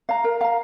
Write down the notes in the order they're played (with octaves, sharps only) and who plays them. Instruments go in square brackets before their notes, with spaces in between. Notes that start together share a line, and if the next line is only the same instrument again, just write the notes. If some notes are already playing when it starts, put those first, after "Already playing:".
[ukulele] F5 A#5
A#4
F5 A#5